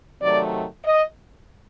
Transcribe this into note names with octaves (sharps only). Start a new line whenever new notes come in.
C3 D#3 F#3 A3 D5
D#5